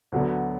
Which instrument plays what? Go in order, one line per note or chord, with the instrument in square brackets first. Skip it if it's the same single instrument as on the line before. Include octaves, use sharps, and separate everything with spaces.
[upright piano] D2 D3 F#3 B3